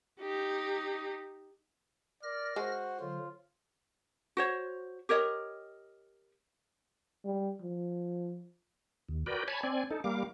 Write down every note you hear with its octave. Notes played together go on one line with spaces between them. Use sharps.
D#4 G4
A#4 D5 F6 A#6
G#3 F#4 C5
D3 F#3 F4
F#4 C5 C#5
G4 A#4 C#5 D#5
G3
F3
D#2
F#4 A#4 B4 D5 G5
C#5 G#5 A5 B5
C4 D5 G#5
D#4 A4
G3 A#3 F5 D6